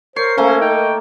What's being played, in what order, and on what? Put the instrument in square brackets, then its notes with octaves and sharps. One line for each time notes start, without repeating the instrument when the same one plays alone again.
[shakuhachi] A#4 [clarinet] C5 [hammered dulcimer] C#5 [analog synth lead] C7
[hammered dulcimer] A3 A#3 [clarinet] C#4 [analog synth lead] C5
[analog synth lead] D#4 [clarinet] G5